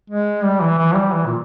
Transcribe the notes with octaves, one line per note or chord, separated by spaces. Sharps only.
G#3
G3
E3
E3
G3
E3
A#2